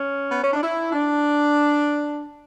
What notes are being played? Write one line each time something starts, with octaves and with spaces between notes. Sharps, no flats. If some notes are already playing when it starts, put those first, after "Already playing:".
Already playing: C#4
B3
C#4
D4
E4
D4